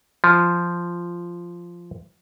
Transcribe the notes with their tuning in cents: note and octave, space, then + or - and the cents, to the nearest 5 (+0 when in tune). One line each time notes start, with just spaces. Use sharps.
F3 -5